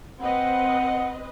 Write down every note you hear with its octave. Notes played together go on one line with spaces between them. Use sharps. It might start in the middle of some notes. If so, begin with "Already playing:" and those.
C4 B4 D#5 F#5